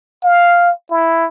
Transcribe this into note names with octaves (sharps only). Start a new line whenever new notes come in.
F5
E4